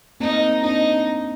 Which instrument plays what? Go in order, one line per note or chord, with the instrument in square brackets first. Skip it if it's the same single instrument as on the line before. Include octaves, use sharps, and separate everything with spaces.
[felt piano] A#3 C4 [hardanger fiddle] D#4
[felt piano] C4 D4 [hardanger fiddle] D#4